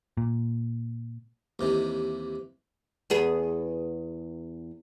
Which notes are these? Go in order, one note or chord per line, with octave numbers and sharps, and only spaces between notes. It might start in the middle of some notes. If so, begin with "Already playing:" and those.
A#2
D#2 C3 E3
E2 B3 G#4